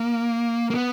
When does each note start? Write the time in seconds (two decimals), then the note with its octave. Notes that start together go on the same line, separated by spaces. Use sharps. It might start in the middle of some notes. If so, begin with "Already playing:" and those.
Already playing: A#3
0.70 A#3
0.75 B3